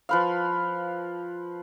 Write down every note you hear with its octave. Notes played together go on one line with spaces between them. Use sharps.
F3 B4 F5